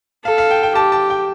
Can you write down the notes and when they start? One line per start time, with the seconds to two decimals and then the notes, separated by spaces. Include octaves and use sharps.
0.25 A4 F5
0.38 F5
0.51 G5
0.63 G5
0.75 G4 A5
0.92 A5
1.10 G5